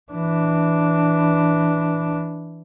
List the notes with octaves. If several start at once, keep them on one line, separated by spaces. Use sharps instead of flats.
E3 D4